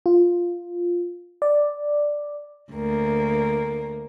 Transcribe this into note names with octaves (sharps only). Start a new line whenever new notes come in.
F4
D5
D2 A#3